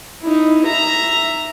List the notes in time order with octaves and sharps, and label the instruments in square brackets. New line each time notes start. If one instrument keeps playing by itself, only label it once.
[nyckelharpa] D#4 E4
E5 A#5